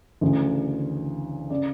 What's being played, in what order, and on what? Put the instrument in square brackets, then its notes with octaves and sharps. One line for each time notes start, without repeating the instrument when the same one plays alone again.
[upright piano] D2 C#3 E3
C#3 D5